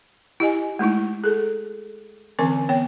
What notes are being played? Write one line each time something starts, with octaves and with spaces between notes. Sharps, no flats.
E4 G4 D#5 G#5
G#3 A3 D#4 E4
G#4 A4
D3 E3 C4 C#4 A#4 G#5
B3 C#5 G5